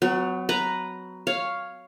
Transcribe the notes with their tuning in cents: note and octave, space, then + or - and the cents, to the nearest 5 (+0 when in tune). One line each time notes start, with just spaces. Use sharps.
F#3 +0 B3 +45
B4 +0 A#5 +0
C#5 +0 F5 +0